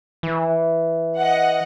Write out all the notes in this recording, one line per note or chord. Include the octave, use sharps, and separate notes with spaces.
E3
D#5 F#5